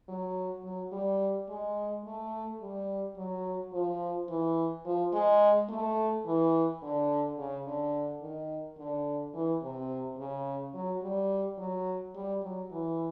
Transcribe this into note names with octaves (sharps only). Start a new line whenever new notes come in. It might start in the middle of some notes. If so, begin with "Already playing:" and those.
F#3
F#3
G3
G#3
A3
G3
F#3
F3
E3
F3
G#3
A3
E3
D3
C#3
D3
D#3
D3
E3
C3
C#3
F#3
G3
F#3
G3
F#3
E3